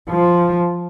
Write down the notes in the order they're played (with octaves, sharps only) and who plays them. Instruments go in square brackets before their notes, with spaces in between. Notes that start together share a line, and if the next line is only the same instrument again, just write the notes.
[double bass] F3